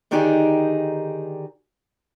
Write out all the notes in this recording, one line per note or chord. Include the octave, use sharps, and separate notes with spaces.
D3 D#3 D4 D#4 G4 G#4